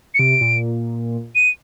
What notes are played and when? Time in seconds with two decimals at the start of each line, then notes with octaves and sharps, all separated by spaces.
0.14 C#7
0.19 C3 D7
0.41 A#2
1.35 D#7